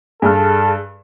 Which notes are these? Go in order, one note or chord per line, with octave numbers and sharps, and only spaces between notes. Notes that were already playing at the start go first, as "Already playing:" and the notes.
G2 G#4 A4 F6